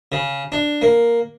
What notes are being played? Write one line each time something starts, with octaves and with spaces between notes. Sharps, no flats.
C#3
D4
A#3